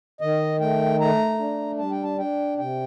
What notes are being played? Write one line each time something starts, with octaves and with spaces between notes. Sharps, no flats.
D#3 D#5
A3 G5
A3 A#5
D4
G3 A5
G5
A5
D4 G5
C3 G5